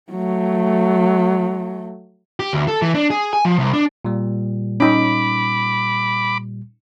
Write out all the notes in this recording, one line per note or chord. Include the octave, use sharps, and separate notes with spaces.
F#3 A3
G4
D2
A4
E3
D4
G#4
G#5
F3
C2
D4
A#2 G3
C#4 D#4 B5 D6